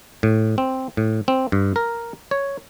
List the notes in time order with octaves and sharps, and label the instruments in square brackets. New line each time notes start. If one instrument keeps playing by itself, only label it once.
[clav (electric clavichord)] A2
C4
A2
C4
G2
A#4
C#5